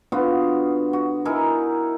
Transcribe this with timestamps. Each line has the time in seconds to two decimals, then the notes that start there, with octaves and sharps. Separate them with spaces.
0.12 D3 B3 F4 F#4
0.93 F#4
1.25 D#4 E4 A#4 G#5